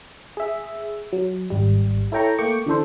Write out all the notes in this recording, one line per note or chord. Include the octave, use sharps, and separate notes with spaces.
G#4 E5
F#3
G#1 G3
E4 A4 C#5 G5 A#5 C#6
A3 A#3 G5 C#6 D6 C#7
D3 E3 D4 A4 C5